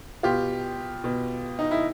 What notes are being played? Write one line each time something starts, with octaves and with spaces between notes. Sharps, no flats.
B2 F4 G4
B2
D#4
E4